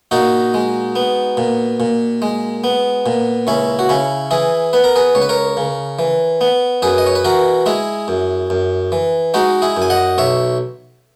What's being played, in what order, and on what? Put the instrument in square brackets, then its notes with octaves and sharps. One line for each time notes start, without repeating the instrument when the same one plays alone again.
[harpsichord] A#2 D#4 F#4
G#3
B3
A#2
A#2
G#3
B3
A#2
C#2 C#4 E4
F#4
C#3 C#4 E4
E3 E4 G#4
B3 B4
A#4
G#4 B4
C#2 C#5
B4
A#4 C#5
C#3
E3
B3
F#2 G#4 B4
D#5
C#5
B4
E3 F#4 A#4
G#3 E4 G#4
F#2
F#2
E3
G#3 D#4 F#4
E4 G#4
F#2
G#5
D#5 F#5
B1 C#5 E5